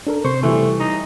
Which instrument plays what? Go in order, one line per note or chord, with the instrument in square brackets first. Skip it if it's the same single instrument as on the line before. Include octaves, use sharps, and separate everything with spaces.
[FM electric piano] D4 A4 A#4
[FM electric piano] C3 C#6 [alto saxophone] C5
[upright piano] E3 G3 [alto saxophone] A3
[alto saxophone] D#4